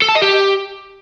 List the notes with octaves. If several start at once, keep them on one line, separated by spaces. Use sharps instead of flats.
A4
A5
D#5
G4